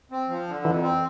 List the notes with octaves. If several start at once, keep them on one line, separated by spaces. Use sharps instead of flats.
C4
F3
D3
F2 E3
C4